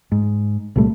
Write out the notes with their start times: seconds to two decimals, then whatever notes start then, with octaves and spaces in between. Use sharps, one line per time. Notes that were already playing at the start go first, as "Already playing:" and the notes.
0.12 G#2
0.76 C2 A#2 G3 A3